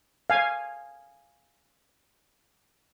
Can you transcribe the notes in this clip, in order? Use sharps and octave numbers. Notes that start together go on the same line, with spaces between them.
F5 G#5